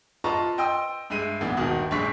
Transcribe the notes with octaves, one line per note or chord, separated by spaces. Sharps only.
F4 B4 D#5 A5 A#5 C#6
D#5 G5 C6 D#6 E6
G2 G#3 E5 D#7
B1 A#2 E3 B3
D#1 G2 D#3 F#4
A#1 G2 G#3 C#6 B6